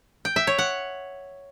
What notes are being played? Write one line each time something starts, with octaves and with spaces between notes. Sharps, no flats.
G5
E5
C#5
F#5